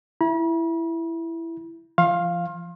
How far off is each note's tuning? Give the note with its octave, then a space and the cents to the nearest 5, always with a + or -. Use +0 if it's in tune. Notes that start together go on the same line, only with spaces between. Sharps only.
E4 +10 B5 -45
F3 -35 F5 +0 C6 +35